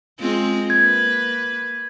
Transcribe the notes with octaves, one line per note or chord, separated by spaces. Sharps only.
G#3 C4 F4
A#3 B4 G#6